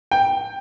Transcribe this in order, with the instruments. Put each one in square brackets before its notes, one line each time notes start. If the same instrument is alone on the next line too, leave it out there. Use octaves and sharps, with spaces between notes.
[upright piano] G5